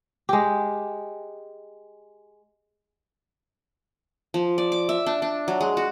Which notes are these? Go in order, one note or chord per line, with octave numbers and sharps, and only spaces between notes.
G#3 G4
F3
D5
D6
E5
D4
D4
F#3
G#3
F#4